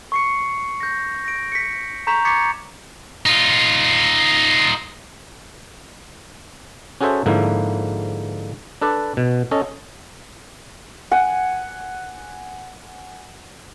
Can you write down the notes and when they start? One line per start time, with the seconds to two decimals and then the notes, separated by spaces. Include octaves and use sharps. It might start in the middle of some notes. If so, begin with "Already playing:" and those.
0.12 C#6 C7 C#7
0.80 G6 A#6
1.25 A#6 D7
1.52 B6 C#7
2.07 A#5 C#6 G6 B6 E7 F7
2.25 C#6 D6 G#6 A6 B6 C#7
3.26 D#4 F4
7.01 C#4 F#4 G#4 A4 C5 E5
7.26 G#2 D3 F3 A#3 E4
8.82 D4 A4 B4 D5
9.17 B2
9.51 C#4 A4 D#5
11.11 F#5 G#5